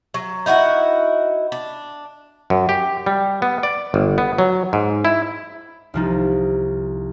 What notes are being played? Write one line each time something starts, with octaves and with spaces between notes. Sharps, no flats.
F#3
D#4 E4 F#4 F#5
D4
F#2
G4
G3
B3
D5
G1
B3
F#3
G#2
E4
C2 F3 D#4